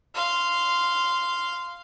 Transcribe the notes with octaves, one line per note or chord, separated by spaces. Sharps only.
F5 C6